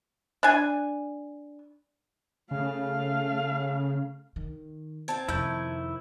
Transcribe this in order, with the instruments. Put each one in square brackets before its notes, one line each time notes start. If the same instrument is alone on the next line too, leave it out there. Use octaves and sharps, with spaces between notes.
[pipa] D4 G#5
[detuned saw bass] C#3 [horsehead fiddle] A3 F5
[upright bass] D#3
[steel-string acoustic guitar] C4 F4 [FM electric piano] A5 G#6
[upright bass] F2 C3 [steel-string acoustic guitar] D#3 F3 A3 [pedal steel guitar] E4 G6